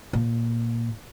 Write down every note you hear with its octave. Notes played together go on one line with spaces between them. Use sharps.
A#2